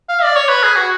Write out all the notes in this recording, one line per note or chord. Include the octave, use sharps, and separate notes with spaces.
F5
D5
C#5
B4
G#4
F#4